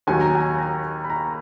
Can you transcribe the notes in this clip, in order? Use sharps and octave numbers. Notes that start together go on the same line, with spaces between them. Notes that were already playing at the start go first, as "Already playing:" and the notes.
D#2 D#3 F#3 G#5
A#5
G#5
A#5
B5
A#5